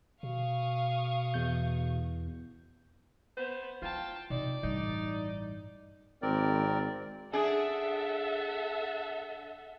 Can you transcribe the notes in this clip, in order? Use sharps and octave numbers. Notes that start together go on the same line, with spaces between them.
B2 F5 C#6 D#6
E2 G6
B3 C5
E4 F4 G5 A5
C3 D#4 D5
A1 G2 D#4
G#1 C4 A#4 D5
D4 G#4 A4 E5 F#5